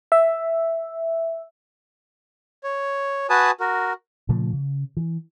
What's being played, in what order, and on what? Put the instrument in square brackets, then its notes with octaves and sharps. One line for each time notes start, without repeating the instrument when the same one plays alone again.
[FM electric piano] E5
[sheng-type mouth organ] C#5
F#4 B4 G#5 A5 D#6
F#4 A#4
[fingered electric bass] A#2 C#3 F3 A3
C#3
E3